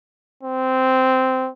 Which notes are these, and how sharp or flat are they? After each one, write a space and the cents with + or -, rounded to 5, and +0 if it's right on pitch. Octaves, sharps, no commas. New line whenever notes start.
C4 -10